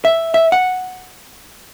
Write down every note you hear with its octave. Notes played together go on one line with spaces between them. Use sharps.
E5
E5
F#5